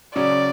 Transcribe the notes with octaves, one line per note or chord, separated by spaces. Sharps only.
C#3 F#3 C#4 D5